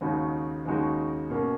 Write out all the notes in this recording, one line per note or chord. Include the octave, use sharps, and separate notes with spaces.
D#2 C#3 G#3 D#4 F#4
D#2 C#3 G#3 D#4 F#4
B2 A#3 C#4